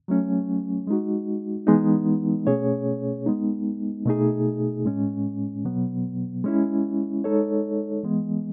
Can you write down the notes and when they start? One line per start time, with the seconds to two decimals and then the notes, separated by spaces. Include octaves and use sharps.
0.08 F#3 A3 C#4
0.87 G#3 D#4 F#4
1.67 E3 G#3 B3 D#4
2.47 B2 A3 C#4 G#4 C#5
3.26 G#3 B3 D#4
4.06 B2 A3 D#4 G#4
4.85 A2 G#3 C#4
5.65 B2 F#3 B3
6.44 G#3 C#4 E4
7.24 G#3 D#4 A4 C#5
8.03 E3 G#3 B3